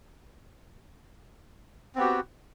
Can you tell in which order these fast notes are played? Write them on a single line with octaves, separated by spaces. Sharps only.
C4 B3 G4 F#4